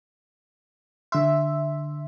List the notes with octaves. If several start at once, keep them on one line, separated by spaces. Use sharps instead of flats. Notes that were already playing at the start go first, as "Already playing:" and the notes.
D3 E5 C6